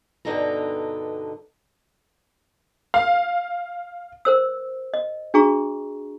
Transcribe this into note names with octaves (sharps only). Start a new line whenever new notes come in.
G2 B2 D3 D#4 A4 A#5
F5
A#4 C5 E6
D#5
D4 F#4 G#4 A#5 C#6